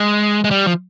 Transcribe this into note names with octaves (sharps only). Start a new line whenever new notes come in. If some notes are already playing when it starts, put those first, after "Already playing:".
Already playing: G#3
G#3
G3
F3